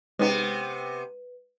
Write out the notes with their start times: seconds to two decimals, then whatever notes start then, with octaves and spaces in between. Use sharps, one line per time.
0.19 C3 G#3 B3 C#4 D#4 B4